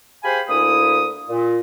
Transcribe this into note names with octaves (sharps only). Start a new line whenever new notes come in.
G4 G#4 C5 F5 G#5 B5
D2 A#3 E4 D#6
A#2